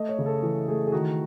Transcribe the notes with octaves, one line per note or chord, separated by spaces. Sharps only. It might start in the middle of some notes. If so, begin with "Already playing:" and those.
Already playing: A3 D#5
C#5
C#3
A4
E3 G#4
A3 G#4
G#4
D#3 F#4